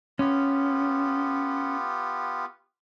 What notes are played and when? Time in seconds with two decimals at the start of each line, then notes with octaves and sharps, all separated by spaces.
0.19 B3 C#4 F4 G4